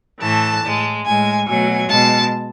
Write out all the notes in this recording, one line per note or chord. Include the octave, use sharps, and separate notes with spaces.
A2 E3 A3 A5
A2 G#3
A2 G#3 G#5
B2 F#3 A3 G#5
B2 G#3 A5